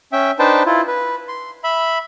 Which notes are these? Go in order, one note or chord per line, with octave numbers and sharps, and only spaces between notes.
C#4 E5 G5
D4 D#4 B4 C5 G5 A5
E4 F4
B4
C6
E5 B5